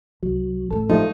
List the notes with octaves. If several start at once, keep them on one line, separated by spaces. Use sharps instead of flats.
C2 F#3
A1 A2 A4
F3 G3 A3 D#4